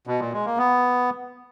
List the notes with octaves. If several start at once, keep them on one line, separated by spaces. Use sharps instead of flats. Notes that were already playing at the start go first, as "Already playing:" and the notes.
B2
A#2
G#3
A#3
B3